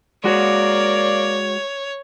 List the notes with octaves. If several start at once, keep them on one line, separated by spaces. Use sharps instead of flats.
G#3 A#3 F#4 C#5 D5